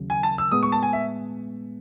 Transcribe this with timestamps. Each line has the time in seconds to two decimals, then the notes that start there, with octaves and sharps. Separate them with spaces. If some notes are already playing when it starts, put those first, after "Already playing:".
Already playing: D#2 C#3 F#3
0.10 G#5
0.23 A5
0.38 E6
0.52 A2 G#3 B3 D#6
0.63 C#6
0.72 A5
0.83 G#5
0.93 E5